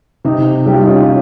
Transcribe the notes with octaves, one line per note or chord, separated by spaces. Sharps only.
C3 D#4
G3 G4
F4
D#4
C#4 F4